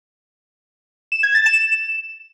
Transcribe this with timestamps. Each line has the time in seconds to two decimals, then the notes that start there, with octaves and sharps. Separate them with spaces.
1.12 E7
1.23 G#6
1.34 A6
1.46 E7